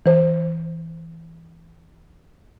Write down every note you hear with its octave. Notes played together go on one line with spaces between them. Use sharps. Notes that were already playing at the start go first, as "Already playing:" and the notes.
E3 C5